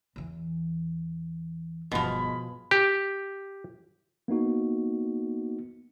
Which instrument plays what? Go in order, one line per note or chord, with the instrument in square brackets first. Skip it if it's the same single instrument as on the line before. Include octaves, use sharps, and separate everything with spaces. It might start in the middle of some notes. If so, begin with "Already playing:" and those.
[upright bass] E2 E3
[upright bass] G1 [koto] B2 F3 [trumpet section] G#3 B5
[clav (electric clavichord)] G4
[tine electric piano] A#3 B3 D#4 F#4